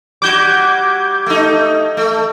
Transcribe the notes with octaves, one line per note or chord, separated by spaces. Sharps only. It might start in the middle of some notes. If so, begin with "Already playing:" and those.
G3 F#4 D6 G6 G#6
A3 D#4
A3